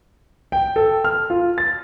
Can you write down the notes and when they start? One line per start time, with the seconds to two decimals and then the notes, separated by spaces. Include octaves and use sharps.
0.52 G5
0.76 A4
1.05 F6
1.30 F4
1.58 A6